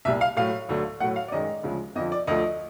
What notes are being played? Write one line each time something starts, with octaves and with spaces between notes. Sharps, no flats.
C2 A#2 G3 E5
F5
A2 F#3 A3 F5
D2 D3 F#3 A3
A2 F#3 A3 F#5
F5
D5
F#2 D#3 G#3 D#5
D2 C#3 F3 G#3
F2 D3 F3 D#5
D5
D2 D3 F3 A3 D#5